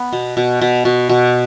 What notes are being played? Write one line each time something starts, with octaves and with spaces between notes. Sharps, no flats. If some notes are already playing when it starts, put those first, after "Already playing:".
Already playing: B3
B2
B2
B2
B2
B2